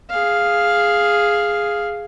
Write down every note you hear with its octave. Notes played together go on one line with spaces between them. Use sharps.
G#4 F5